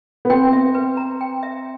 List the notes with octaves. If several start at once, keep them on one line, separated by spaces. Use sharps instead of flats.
B3
C4 G5
E5
B4
A#5
G5
E5